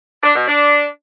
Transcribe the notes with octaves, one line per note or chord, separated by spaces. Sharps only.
D4
B2
D4